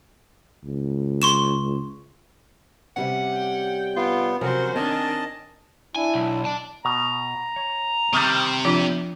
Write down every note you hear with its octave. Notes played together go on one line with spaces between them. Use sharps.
C#2
C6 C#6 E7
C3 G3 C#4 F#5
G5
B3 F4
C3 F3 F#3 C#4 F#4 A#4 C5
D#3 C4 D4 C#5 D#5 G#5 A5
D4 E4 G#5
B1
D5 A5
B2 A#5
C#5
C3 D#3 G3
F3 D4 F4